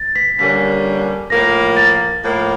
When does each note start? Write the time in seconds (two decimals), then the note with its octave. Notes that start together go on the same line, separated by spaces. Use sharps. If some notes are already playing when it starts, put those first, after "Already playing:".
Already playing: A6
0.16 B6
0.38 D3 G3 A#3 C#4 B6
1.30 A2 F3 A#3 A#6
1.77 A6
2.23 A2 F3 A#3